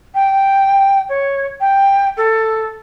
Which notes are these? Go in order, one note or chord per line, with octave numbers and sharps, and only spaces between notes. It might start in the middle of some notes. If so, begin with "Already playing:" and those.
G5
C#5
G5
A4